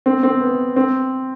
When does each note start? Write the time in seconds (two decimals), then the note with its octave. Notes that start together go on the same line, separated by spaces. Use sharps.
0.06 C4
0.23 C4
0.41 B3
0.76 C4